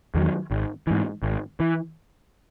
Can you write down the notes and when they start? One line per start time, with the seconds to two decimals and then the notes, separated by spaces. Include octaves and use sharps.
0.15 E2 D#3 F#3
0.51 G#1
0.87 G#2 E3
1.23 G#1
1.60 E3